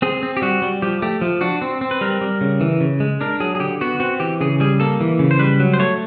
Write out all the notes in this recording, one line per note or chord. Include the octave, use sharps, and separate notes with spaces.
C4 G#4
C4
G4
G3 F#4
G3
F3 G4
A3 G4
F3
D4 F#4
C4
C4
B4
G3 A#4
G3
C#3
E3
C#3
G#3
D4 A#4
F#3 G#4
G#4
D3 G4
B3 F#4
C4 F#4
E3 G4
C#3 G#4
G3 G#4
A#3 A4
E3
C#3
C5
G3 B4
F#3
C5
A3 C#5